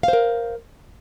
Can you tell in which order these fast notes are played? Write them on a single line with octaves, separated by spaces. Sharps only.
F5 C5 A#4